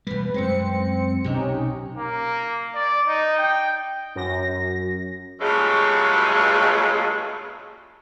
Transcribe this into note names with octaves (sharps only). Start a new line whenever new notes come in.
E1 G3 B4
F#2 G#3 C4 C#7
B1 C3 C#4 D#4 G4
A#3
D5
D#4
G5
F#2 A#6
G2 A#2 C#3 F#3 G#3 A3